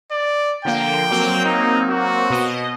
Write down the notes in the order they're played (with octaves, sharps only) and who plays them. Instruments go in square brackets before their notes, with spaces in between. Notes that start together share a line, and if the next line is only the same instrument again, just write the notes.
[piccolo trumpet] D5
[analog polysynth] D3 F3 A#3 [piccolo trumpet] G5
[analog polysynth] F#3 A#3 C4
[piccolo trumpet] D#4
F#4
[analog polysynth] B2 D#5